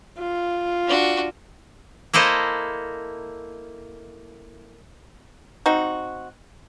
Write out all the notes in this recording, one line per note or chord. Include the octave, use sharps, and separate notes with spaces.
F4
D4 F#4
A#3 E4 A4 C5 D#5
C4 D#4 F#4